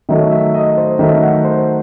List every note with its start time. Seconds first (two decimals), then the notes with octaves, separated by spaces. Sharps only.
0.09 D#3 F#3 A3 E5
0.31 E5
0.54 D#5
0.77 C5
0.99 D#3 F#3 A3 E5
1.22 F#5
1.45 C5